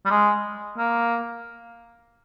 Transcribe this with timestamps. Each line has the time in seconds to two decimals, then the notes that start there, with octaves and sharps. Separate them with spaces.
0.06 G3
0.10 G#3
0.77 A#3